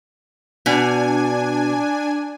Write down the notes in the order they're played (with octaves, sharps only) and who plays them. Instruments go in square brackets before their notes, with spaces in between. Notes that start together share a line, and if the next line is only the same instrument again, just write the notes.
[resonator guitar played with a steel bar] B2 [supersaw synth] D4 G#5